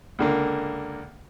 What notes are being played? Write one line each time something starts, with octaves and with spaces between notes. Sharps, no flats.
C#2 D3 A#3